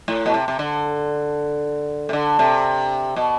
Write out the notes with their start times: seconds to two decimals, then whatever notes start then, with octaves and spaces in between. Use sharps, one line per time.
0.08 A2
0.26 B2
0.34 C3
0.48 C3
0.59 D3
2.09 C3
2.13 D3
2.39 C3
3.16 B2